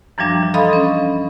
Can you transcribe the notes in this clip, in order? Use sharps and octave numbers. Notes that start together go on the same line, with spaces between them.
F#2 E3 F3 G3 D4
E3
A4 D#5 F5 B5 C6 D#6
C#4